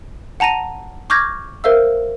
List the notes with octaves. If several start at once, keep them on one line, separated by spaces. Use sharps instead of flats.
F#5 A5 A#5 A#6 D#7
C#6 D6 F6 G6 G#6 A#6
A#4 C5 E5 F5 E6